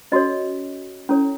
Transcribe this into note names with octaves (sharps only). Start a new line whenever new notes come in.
C#4 F#4 A4 C#5 D#5
C#4 E4 A4 C#5